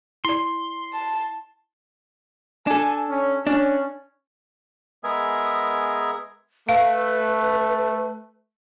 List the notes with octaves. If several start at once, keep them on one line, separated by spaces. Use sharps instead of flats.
E4 D5 C6
A5
D4 A4 G#5
C#4
C#4 D4
G#3 B3 G#4 A#4 E5 G#5
A3 B4 F5